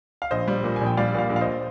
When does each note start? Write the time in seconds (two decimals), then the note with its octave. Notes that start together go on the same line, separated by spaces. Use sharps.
0.22 F5
0.31 A#1 C5 D#5
0.48 G3
0.64 A#2
0.76 A#1 G#5
0.86 G5
0.97 G3 D5 F5
1.14 A#2 D5 F5
1.30 A#1
1.36 F5
1.41 C5 D#5